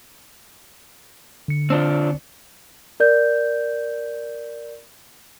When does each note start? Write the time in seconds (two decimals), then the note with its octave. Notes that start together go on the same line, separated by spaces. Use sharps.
1.48 D3 C#7
1.70 C4 D4 F4
3.00 A#4 D5 G6